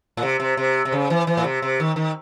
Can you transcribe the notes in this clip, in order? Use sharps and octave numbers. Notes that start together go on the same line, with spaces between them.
A2
C3
C3
C3
C3
C#3
E3
E3
A2
C3
C3
D#3
D#3